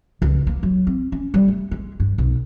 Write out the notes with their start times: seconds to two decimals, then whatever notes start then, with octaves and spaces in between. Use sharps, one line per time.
0.22 C#2
0.47 A#3
0.63 F#3
0.87 C4
1.12 C#4
1.34 G3
1.48 A3
1.71 G#3
2.00 G2
2.18 B1